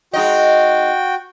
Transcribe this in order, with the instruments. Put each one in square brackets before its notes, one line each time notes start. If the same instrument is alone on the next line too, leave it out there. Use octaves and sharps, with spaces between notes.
[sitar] G#3 D#4 D#5 [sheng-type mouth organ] F#4 G5